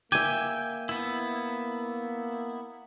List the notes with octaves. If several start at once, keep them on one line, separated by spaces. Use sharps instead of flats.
A#3 E5 G5 G#5 D6 G#6 D#7
B3 E4